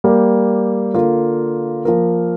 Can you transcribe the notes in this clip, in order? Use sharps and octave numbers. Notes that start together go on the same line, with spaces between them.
G3 A#3 G4 A#4
D3 A#3 F4 A#4
F3 A#3 F4 A#4